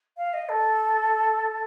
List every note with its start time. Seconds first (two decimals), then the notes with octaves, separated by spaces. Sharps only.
0.17 F5
0.33 D#5
0.49 A4